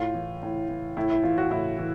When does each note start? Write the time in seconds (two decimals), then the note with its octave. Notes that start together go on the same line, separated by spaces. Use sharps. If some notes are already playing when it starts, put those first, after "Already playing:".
Already playing: A2 F4
0.14 E3
0.43 A2
0.69 E3
0.97 A2 E4
1.10 E4
1.23 E3 F4
1.38 F#4
1.51 A2 E4
1.78 E3